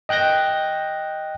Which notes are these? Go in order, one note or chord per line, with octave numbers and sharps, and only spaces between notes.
D#5 G5 F#6 G6 A#6